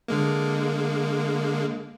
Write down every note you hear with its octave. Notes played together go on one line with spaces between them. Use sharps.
D3 G#3 A#3